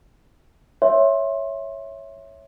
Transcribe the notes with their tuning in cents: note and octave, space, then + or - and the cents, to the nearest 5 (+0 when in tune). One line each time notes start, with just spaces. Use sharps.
C#5 +0 E5 +0 C6 +20